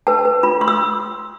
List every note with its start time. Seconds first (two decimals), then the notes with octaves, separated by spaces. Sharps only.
0.07 B4 A5
0.25 B4
0.43 F4 B5
0.61 F4 C6
0.68 E6